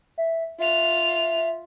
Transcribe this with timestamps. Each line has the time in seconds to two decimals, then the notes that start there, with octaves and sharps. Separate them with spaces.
0.18 E5
0.59 F4 E5 F7